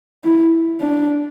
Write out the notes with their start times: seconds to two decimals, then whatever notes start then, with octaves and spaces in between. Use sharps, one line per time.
0.24 E4
0.81 D4